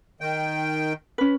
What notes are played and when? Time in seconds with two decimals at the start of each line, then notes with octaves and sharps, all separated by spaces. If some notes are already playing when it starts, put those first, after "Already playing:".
0.21 D#3 G5
1.18 C#4 B4